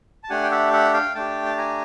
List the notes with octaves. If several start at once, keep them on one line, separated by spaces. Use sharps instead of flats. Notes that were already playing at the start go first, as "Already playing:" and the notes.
A5
A3 D4 G4 F#5 G#5
G5
E5 F#5
E5 F#5
F5 G5
A3 D4 G4 G5 A5
A5
G#5 A#5